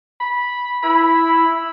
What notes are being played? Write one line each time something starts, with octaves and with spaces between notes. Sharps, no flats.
B5
E4 B5